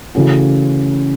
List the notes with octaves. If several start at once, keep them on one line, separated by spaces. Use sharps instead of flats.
C#3 E3 A3 C#4 F#4